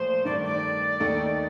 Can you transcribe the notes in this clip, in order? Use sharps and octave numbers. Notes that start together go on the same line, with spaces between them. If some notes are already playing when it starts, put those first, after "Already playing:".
Already playing: A#2 F3 A3 C5
G2 D#3 A3 D5
D5
D#2 D#3 A3 D#4 A4